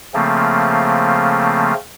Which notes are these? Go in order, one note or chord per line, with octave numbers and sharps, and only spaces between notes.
C#3 F3 A3 A#3 C4